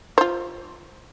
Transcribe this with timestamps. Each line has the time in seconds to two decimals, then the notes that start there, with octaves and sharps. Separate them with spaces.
0.18 F4 C5